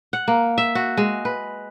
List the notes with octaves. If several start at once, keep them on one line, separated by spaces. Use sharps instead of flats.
F#5
A#3
E5
F#4
G#3
B4